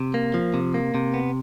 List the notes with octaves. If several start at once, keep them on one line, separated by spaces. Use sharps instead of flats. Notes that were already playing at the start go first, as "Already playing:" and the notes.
Already playing: C3
A#3
F3
C3
A#3
C3
B3